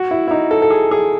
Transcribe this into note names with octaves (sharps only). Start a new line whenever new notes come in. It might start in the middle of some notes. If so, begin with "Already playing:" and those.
Already playing: F#4
E4
E4
D#4
A4
A4
G#4
G#4